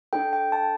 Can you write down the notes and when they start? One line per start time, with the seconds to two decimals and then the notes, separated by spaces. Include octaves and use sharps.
0.13 D4 A4 G5
0.33 G5
0.52 A5